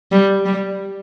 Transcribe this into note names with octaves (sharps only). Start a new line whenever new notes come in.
G3
G3